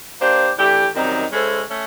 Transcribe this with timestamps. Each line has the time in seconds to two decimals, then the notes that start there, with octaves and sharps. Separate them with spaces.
0.20 A#3 D4 G4 C5
0.57 E3 A3 D4 G4
0.94 F#2 D#3 G3 C4 D#4
1.32 G#3 C#4 E4 A4 C5
1.69 A3 C#4